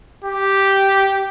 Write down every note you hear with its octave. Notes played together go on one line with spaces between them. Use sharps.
G4